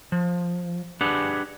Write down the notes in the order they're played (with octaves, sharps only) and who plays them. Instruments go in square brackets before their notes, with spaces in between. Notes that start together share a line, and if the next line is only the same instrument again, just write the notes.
[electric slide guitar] F3
D4 G4 G#4 B4 F#5